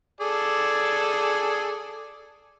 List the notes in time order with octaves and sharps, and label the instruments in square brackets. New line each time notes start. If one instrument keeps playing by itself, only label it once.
[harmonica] G#4 A4 D5